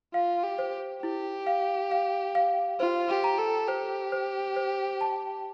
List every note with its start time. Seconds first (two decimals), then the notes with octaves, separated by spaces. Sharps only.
0.14 F4 F5
0.43 G4
0.58 C5
1.03 E4 G4
1.47 F5
1.91 F5
2.35 F5
2.80 F4 C5
3.09 G4
3.24 A#5
3.39 A4
3.68 G4 C5
4.12 C5
4.56 C5
5.01 A5